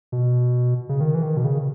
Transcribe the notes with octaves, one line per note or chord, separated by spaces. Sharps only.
B2
C#3
D#3
E3
D#3
B2
C#3